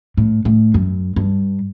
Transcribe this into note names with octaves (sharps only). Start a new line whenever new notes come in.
A2
A2
F#2
G2